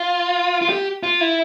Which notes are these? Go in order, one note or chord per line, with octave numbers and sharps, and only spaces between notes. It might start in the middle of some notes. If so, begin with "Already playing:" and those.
Already playing: F4
F4
G4
F4
E4